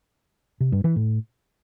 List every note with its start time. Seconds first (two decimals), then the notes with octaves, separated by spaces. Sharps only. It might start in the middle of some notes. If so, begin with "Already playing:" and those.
0.60 C3
0.72 G2
0.84 E3
0.96 A2